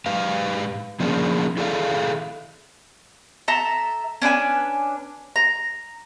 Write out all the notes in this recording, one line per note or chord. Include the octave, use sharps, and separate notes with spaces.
G#2 G4 B4 F5
F3 A#3 C#4 D4 G#4
E4 G#4 A4 D5 E5 F5
A4 E5 A5 A#5
C#4 D4 B4 G#5
A#5